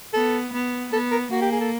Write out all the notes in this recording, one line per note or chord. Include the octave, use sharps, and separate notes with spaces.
B3 A4
B3
B3 A4
A#4
A#3 F#4
G4
G#4
A4